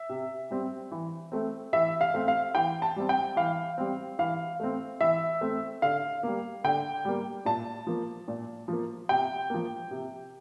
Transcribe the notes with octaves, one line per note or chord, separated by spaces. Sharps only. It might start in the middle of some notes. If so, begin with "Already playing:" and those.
Already playing: E5
C3
G3 C4
E3
A3 C4
E3 E5
F5
A3 C4
F5
E3 G5
A5
G3 C4
G5
E3 F5
G3 C4
E3 F5
A3 C4
E3 E5
A3 C4
D3 F5
G3 A#3
D3 G5
G3 A#3
A#2 A5
F3 A#3
A#2
F3 A#3
C3 G5
F3 A#3
C3